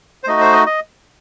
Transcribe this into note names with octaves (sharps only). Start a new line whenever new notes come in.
C5
A3 D#4 F#4 D#5
C5
D#5
D#5